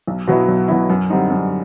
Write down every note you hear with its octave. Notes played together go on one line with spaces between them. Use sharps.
B1
B2 F#3 B3 E4
B1
B2 F#3 B3 E4
F#2
D3 G3 C4 D#4
F#2